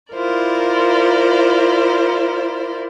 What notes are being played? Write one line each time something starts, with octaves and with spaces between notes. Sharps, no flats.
E4 F4 A#4 C5 D5